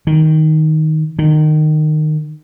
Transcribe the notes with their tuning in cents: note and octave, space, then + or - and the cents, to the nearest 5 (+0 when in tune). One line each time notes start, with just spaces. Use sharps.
D#3 +5
D#3 -20